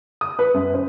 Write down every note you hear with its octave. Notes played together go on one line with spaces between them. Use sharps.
D#6
B4
F#2
C5